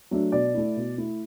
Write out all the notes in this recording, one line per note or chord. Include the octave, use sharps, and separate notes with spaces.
F#3 A3 D4
B2 D5
A3 E4
B2
A3 E4